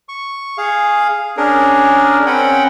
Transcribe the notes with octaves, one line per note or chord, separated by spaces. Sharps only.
C#6
G#4 F5
C#4 D4 G#4 A#4
C4 C#4 F#5 G5 B5